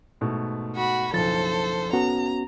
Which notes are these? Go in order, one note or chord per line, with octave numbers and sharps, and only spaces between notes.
G#2 B2 A3
F#4 B5
F#1 B1 F3 A4 C5 A6
B3 C#4 F#4 A#5